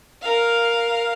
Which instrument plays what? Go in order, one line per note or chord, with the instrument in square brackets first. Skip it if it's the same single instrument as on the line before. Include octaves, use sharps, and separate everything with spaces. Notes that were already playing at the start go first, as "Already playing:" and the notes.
[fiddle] A#4 F5